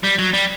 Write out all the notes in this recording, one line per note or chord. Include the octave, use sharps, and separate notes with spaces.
G3
F#3
G3